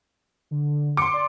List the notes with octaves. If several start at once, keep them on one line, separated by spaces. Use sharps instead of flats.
D3
C6 D6 C#7
D5